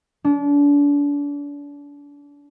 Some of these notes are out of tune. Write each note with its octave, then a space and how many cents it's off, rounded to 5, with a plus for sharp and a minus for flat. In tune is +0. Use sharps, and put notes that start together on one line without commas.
D4 -35